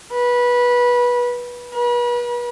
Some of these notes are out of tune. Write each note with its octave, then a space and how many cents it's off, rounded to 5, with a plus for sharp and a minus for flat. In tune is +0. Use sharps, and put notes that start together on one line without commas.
B4 -20
B4 -40